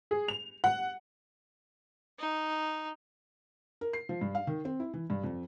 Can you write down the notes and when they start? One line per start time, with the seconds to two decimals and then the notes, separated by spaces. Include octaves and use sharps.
0.11 G#4
0.28 F7
0.64 F#5
2.19 D#4
3.81 A#4
3.93 C7
4.09 F3
4.21 G2
4.35 F5
4.47 D#3
4.65 C4
4.80 E4
4.94 E3
5.10 G2
5.24 F2